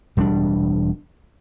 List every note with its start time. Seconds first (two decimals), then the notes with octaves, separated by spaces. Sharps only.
0.17 E1 G3 A#3 D4